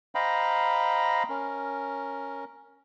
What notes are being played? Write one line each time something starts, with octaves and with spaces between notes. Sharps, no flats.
C5 D#5 F5 G5 A#5 B5
C#4 A#4